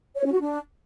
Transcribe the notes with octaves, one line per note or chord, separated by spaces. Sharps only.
C#5
C#4
F#4
D4